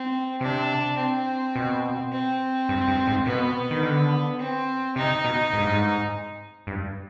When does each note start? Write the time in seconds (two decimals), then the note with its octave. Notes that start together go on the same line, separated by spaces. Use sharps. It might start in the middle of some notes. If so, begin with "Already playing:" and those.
Already playing: C4
0.41 C3 D4
0.98 C4
1.56 B2
2.12 C4
2.69 G2
2.88 G2
3.07 G#2
3.25 B2 B3
3.71 D#3
3.83 D3
4.40 C4
4.96 C3 D#4
5.24 B2
5.53 G#2
5.61 G2
5.69 G#2
6.67 G2